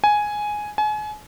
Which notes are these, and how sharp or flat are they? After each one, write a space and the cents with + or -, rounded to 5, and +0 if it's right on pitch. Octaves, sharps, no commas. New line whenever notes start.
G#5 +5
G#5 +35